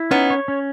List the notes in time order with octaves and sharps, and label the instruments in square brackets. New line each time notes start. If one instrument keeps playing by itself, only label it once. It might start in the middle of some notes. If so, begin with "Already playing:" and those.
Already playing: [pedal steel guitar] E4
[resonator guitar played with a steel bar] B3 D#4 [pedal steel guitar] C#4
[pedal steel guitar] C#5
C#4